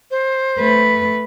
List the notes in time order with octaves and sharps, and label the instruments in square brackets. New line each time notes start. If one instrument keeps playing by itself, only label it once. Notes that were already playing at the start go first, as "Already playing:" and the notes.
[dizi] C5
[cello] A3 B4